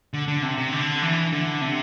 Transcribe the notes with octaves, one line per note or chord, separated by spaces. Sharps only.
D3
D3
C3
C3
D3
E3
D3
C3